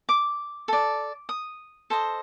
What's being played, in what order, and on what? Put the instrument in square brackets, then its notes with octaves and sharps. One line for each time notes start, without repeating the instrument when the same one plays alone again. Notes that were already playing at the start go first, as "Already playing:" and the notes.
[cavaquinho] D6
A4 D5
D#6
A4 C5 D#5